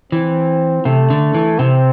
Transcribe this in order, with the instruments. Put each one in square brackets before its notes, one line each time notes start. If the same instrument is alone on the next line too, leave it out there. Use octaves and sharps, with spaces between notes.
[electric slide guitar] E3 [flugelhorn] C4
[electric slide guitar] C3 [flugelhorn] A3
[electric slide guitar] D3
E3
[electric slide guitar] C3 [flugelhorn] C4